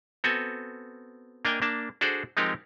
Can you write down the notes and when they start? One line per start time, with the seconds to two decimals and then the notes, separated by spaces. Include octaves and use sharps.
0.24 B3 C4 F#4 A4 G#5
1.45 A#3 D4 A#4 D#5 G5 G#5
1.62 A#3 D4 A5
2.01 D4 F#4 G#4 A4 C5 D5
2.37 F3 G#3 C4 D#4 G4 A#4